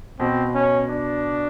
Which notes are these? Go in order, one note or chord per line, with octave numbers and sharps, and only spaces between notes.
B2 C4
C#4
D4